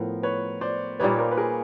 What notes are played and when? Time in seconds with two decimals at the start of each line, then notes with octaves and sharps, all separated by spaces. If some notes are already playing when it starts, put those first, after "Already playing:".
Already playing: A2 F3 B3 A#4
0.23 B4 C#5
0.61 C5 D5
0.99 A#2 G3 A#3 D#4 B4 C#5
1.19 A#4 C5
1.31 B4
1.37 G#4 A#4